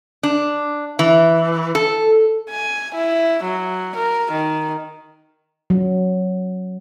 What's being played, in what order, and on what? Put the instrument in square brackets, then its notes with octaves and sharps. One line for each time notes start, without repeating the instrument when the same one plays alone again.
[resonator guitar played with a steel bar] D4
E3
A4
[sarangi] G#5
E4
F#3
A#4
D#3
[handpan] F#3